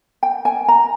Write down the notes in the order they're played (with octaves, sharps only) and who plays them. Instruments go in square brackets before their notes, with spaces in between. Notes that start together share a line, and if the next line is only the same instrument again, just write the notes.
[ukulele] G5
G#5
A#5